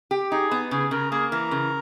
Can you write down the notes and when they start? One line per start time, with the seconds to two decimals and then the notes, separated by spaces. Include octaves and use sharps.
0.11 G4
0.31 D#4 G#4
0.51 B3
0.71 C#3 G#4
0.91 C#3 A#4
1.11 A#3 G#4
1.31 E3 A#4
1.51 C#3